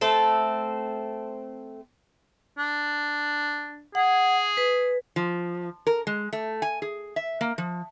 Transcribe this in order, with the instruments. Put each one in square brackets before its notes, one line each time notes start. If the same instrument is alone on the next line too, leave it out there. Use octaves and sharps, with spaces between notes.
[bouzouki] A3 C4 A4
[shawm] D4
[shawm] G#4 [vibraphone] F#5
[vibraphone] B4
[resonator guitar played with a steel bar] F3
A#4
G#3
A3
G#5
G#4
E5
A#3
F3